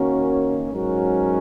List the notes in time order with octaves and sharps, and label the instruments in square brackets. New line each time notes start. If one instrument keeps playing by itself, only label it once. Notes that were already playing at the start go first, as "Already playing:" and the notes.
Already playing: [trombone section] D#3 A#3 C#4 F#4 A#4
G#2 F#3 C#4 F#4 A#4